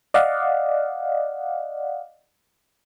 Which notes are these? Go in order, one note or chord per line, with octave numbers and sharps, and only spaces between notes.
D5 D#5 F5 F#5